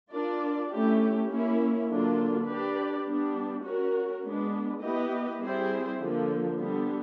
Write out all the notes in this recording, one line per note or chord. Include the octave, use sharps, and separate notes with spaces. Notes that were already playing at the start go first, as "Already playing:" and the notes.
D4 F4 A#4 D5
A3 C#4 E4 G4
A#3 C#4 E4
D3 F#3 A#3 D4 F4
D4 G4 B4 D5
G3 B3 D4
C#4 F#4 A#4
G#3 B3 D4
B3 E4 G4 B4 D#5
G3 C4 E4 G#4 C5
D3 F3 A#3
D3 G3 B3